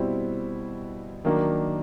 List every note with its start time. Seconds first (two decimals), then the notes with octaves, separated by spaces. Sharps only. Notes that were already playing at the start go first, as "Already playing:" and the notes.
Already playing: B2 G3 C4 E4
1.25 D#3 F#3 A#3 D4